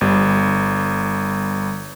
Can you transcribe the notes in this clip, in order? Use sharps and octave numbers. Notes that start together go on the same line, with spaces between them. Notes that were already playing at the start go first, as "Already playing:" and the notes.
G1 G3